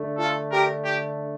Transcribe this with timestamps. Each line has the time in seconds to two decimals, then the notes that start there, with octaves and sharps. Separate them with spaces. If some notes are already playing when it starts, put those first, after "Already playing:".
Already playing: D3 A3 D4
0.18 F4 A4
0.51 G4 A#4
0.84 G4